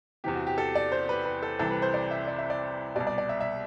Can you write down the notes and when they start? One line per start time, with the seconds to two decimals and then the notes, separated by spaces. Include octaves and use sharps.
0.24 E2 C3 E3 G4
0.35 F#4
0.47 G4
0.58 A4
0.75 D5
0.92 C5
1.09 B4
1.25 B4
1.43 A4
1.59 C2 C3 E3 A4
1.71 B4
1.82 C5
1.94 D5
2.11 E5
2.28 D5
2.39 E5
2.50 D5
2.96 B2 D5
3.01 C2
3.07 D5
3.18 D5
3.29 E5
3.40 E5